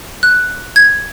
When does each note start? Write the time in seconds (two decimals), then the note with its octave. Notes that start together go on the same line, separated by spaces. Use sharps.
0.23 F#6
0.76 G#6